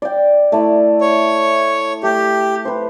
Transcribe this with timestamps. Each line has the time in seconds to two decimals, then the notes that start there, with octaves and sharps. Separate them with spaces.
0.02 D5 G5
0.52 A3 E4 D5
1.01 C#5
2.03 A3 G4
2.65 B4 C5